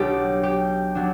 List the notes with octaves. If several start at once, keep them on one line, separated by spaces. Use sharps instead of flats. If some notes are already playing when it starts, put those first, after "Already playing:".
Already playing: B1 B2 G3 D4 G4
G4
F#3 B3 D4